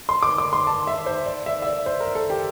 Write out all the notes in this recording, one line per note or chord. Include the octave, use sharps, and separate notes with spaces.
C6
D6
D6
C6
A5
E5
C5
D5
E5
E5
D5
C5
A#4
A4
G4